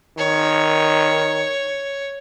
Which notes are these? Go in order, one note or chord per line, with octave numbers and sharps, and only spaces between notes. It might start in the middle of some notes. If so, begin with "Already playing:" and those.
D#3 C#5